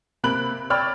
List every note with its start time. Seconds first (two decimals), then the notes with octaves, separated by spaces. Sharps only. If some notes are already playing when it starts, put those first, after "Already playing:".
0.24 C3 A#3 B5 F#6 D7 F#7
0.70 C#5 D5 G5 B5 E6 F6